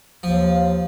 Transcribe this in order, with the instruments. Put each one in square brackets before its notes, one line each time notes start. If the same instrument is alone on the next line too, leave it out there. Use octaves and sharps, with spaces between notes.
[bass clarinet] D#2 [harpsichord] F3